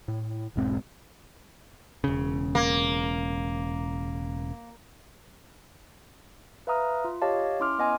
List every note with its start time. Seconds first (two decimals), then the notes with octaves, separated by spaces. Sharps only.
0.08 A2
0.56 E1 B1 G#2 C4
2.04 E1 C#3
2.55 A#3
6.67 B4 E5 F5 A#5 D#6 F6
7.04 F4
7.22 G4 C#5 D#5 F5 A5
7.60 C#4 E4 C6 D6 F6
7.79 B3 D#5 G#5 C6